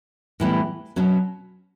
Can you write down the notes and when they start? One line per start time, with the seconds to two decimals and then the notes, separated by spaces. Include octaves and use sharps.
0.40 A2 E3 G3 B3
0.96 B2 F#3 C#4